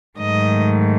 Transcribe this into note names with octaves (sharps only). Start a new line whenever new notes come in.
G#2 D#3 F#3 A3 D#5